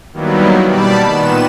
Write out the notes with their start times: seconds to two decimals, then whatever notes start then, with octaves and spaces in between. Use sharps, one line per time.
0.13 D#3 F#3 G3 A#3 B3 E4
0.67 B2 G3 D5 A5 B5
1.06 A#2 D#3 B3 E7